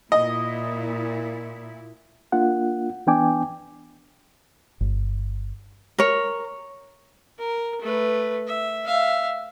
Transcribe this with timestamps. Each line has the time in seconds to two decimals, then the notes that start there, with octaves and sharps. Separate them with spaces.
0.12 A#2 E4 D#5
2.32 A#3 D4 F4 F#5
3.07 E3 B3 D4 G5 G#5 D6
4.81 G1
5.98 A#4 C#5
7.39 A#4
7.81 A3 B4
8.47 E5
8.86 E5 F5